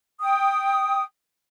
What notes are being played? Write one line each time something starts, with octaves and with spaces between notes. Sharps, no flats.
G5 D#6